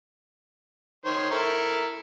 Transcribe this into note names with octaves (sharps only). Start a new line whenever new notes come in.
D#3 C5 C#5
E4 A4 A#4